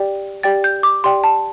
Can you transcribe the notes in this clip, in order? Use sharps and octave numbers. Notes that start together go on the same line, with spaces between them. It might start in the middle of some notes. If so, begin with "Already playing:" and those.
Already playing: G4 D5 G5
G4 D5 G5 A6
G6
D6
G4 D5 G5 C6
A5